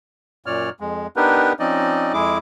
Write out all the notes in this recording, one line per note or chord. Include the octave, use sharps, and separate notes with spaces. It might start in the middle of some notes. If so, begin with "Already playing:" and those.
F#2 A#2 C#5 D5 F6
F2 G#3
B3 D4 D#4 G4 A#4 B4
F3 C4 C#4 D#4 D5 D#5
F2 G#3 E4 G#4 D6